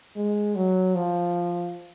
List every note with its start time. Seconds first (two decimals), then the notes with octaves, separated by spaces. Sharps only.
0.16 G#3
0.56 F#3
0.95 F3